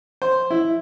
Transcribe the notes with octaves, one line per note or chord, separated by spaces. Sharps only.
C5
E4